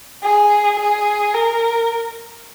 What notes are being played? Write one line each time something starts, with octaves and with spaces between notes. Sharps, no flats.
G#4
G#4
A#4